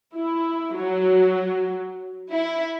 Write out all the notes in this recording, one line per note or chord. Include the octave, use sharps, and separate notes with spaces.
E4
F#3
E4